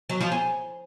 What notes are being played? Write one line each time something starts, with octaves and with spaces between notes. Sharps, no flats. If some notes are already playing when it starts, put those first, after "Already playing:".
F#3
F3
G#4